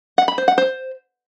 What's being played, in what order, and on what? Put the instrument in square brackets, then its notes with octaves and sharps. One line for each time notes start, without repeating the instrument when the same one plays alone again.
[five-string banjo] F#5
B5
C5
F#5
C5